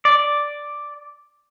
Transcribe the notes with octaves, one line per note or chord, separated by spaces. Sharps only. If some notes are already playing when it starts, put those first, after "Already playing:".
D5